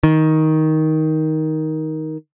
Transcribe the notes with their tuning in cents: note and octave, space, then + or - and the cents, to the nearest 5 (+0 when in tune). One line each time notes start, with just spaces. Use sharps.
D#3 +10